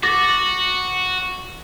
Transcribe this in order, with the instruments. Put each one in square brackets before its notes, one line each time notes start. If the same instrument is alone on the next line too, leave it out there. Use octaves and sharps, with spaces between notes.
[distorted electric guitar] F#4 [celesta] D6 A6 A#6